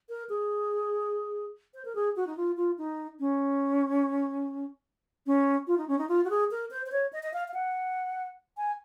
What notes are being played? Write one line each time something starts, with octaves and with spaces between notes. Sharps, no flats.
A#4
G#4
C5
A#4
G#4
F#4
D#4
F4
F4
D#4
C#4
C#4
F4
D#4
C#4
D#4
F4
F#4
G#4
A#4
C5
C5
C#5
D#5
D#5
F5
F5
F#5
G#5